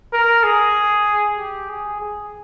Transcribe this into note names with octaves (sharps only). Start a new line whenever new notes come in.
A#4
G#4
G4
G#4
G#4